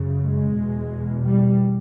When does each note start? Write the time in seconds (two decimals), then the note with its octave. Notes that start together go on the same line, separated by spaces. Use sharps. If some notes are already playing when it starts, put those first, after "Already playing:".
Already playing: F#2 C#3
0.22 G#3
0.55 E2 B2
1.23 G3